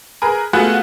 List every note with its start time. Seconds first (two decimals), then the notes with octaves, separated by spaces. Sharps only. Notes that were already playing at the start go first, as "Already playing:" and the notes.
0.22 G#4 A#4 B4
0.53 A3 B3 F4 F#4 G#4 F#5